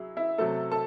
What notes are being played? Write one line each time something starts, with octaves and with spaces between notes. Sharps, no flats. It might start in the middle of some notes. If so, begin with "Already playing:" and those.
Already playing: F#3 E4 G#4
E4 E5
C3 F#3 A3 A4 A5
A4 A5